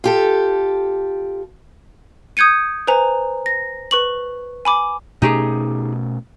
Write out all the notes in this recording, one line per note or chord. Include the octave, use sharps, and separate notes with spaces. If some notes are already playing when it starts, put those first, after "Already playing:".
F4 G4 A4
D#6 G6 G#6 C#7 D#7
B4 C5 G#5 A#5
A#6
B4 C#6 F#7
G#5 B5 D6
B2 A3 C#4 D#4 G4 G#4